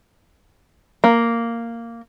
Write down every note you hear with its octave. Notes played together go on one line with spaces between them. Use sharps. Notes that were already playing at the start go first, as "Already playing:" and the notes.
A#3